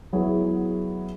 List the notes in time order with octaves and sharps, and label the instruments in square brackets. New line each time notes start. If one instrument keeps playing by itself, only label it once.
[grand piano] F#3 B3 E4 G#4